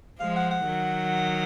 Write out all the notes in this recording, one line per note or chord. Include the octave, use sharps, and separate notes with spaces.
F3 G#3 F5
F#5
F#5
D#3 F#3